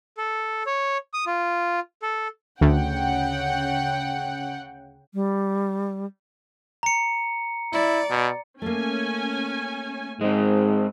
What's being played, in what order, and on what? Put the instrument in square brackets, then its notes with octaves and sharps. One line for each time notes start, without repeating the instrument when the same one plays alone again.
[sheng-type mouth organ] A4
C#5
D#6
F4
A4
[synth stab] D2 [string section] C#3 F#5 G5
[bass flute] G3
[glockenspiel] A#5 C#7
[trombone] E4 [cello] D5
[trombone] B2
[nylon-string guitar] A3 A#3 [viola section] C#4 G#5
[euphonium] G#2 [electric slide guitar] G#3 C4